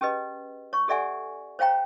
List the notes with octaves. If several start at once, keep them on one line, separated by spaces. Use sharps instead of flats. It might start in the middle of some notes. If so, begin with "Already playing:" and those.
C#4 G4 G#4 B4 D#5
C#5 C#6
G4 A4 D5 E5 F#5 G#5
C5 C#5 F5 G5 A#5